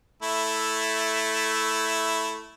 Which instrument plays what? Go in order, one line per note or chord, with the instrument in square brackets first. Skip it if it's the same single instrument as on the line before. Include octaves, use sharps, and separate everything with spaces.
[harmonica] A3 E4